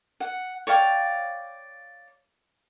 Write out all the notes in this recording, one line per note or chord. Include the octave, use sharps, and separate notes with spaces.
F#5
C#5 D5 F5 G5